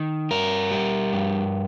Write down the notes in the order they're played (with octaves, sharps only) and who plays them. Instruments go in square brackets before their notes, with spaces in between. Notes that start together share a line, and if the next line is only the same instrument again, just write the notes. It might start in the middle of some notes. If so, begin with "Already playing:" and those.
Already playing: [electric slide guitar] D#3
G2 A#4
G3
G2